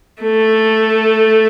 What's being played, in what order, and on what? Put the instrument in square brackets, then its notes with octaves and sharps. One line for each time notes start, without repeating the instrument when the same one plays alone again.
[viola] A3